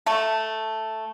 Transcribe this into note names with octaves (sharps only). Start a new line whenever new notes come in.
A3 A4